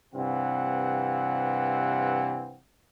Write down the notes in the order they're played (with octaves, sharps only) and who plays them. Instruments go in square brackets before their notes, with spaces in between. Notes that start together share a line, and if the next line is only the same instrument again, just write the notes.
[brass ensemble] G2 C3 E3 C4 F5 F#5